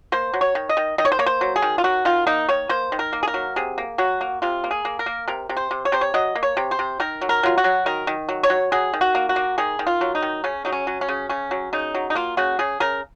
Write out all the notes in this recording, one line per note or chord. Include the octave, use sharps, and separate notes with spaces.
A#3 C5
F#3
C#5
D#3
D#5
D#3
D#3 D#5
C#5
C5
A#3 C#5
C5
F#3
G#4
D#3
F4
F#3 F#4
D#3 F4
A#3 D#4
D#3 C#5
A#3 C5
D#3
A#4
A#3
G#4
A#4
F#3
C3 G#4
A#3
F#3 F#4
A#3
C3 F4
A#3
G#4
A#3
A#4
A#3
C3 A#4
C3
C5
C3
C#5
C3 C5
C#5
F#3 D#5
A#3
C#5
C3
C5
C3
D#3 A#4
F#3
A#4
F#3 F4
F#4
F#3
D#3 A#4
D#3
F#3
C#5
F#3
F#3 G#4
D#3
F#4
A#3
F#4
A#3
D#3 G#4
D#3
F4
F#3
D#4
D#3
C#3 C#4
F#3 D#4
C#4
F#3
C#4
C#3
C#3 C#4
F#3
C#3 D#4
F#3
D#4
A#3 F4
C#3 F#4
C#3 G#4
C#3 A#4